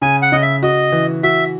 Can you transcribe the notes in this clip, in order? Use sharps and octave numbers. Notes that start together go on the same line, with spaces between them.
C#3 G#5
F#5
C#3 D#5
E5
F#4 D#5
E3
F#4 E5